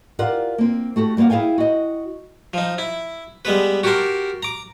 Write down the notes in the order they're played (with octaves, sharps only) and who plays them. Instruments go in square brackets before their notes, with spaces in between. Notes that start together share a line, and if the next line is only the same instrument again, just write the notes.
[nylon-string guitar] F4 G4 A#4 C5 D5 F#5
A#3 C4
A3 F#4 G4 A4
G3 A#3 C5 F5 F#5
E4 G#4 F5 G5 G#5
F#4 D#5
[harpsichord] F3 D#4
E4
G3 G#3 B3 B4
F#4 G4 A#4 A5 C6
A#5 D6